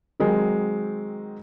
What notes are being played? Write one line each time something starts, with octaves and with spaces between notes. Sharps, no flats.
D#3 F#3 G#3 C4